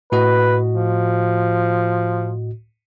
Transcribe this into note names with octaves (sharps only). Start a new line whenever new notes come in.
A2 F#4 B4 D#5
F3